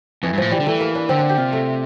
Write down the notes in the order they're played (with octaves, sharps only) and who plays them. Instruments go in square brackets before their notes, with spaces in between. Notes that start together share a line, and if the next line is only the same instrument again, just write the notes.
[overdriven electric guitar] F2 [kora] E3
[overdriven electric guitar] G2
[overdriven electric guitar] A2 [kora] F3
[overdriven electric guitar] E3 [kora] G3
[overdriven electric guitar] D3
[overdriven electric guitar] E3 [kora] A3
[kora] A#3
D4
[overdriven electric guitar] D3 [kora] C4
[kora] D4
G4
[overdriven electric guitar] C3 [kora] F4
[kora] A3